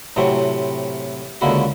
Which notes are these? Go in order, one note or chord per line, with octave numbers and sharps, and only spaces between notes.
A2 C3 E3 F#3 C4
C#2 D3 A#3 E4 F#4